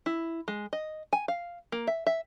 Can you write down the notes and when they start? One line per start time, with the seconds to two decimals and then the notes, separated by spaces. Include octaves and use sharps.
0.06 E4
0.48 G#3
0.73 D#5
1.13 G#5
1.28 F5
1.72 A#3
1.87 E5
2.07 E5